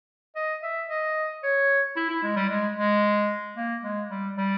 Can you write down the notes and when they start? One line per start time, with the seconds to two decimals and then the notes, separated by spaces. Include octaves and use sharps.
0.36 D#5
0.63 E5
0.89 D#5
1.43 C#5
1.96 E4
2.10 E4
2.23 G#3
2.36 G3
2.49 G#3
2.77 G#3
3.57 A#3
3.84 G#3
4.10 G3
4.38 G3